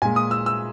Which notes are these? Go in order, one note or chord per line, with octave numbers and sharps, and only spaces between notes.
A#2 G#3 G#5
D#6
E6
E6